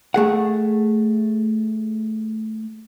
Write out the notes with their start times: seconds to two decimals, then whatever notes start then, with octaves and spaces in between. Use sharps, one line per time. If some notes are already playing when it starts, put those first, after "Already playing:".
0.14 A3 G#4 F#5